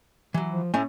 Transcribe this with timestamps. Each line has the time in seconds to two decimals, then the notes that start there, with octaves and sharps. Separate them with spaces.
0.34 E3 F#3
0.51 F3
0.74 A2 A3 C#4 G#5